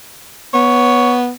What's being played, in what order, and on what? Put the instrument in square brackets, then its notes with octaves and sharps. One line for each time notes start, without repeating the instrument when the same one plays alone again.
[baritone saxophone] B3 [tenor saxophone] C#5